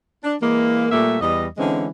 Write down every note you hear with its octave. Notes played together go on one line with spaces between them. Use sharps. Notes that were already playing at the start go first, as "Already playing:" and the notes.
D4
E3 G#3 A#3
A#2 G3 A3 A#3 E5
E2 G3 D#5
D3 E3 G#3 C4 C#4